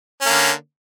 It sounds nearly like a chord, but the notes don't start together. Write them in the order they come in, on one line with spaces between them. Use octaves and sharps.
C#4 A#3 D3